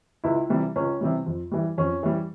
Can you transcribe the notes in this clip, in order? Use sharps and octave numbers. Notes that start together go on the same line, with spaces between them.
C#2 E4
C3 E3 G3
C#2 C#4
C3 E3 G3
F2
E3 G3
F2 C#4
E3 G3